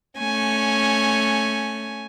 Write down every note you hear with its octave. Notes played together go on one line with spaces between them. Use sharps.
A3 C#4 G#5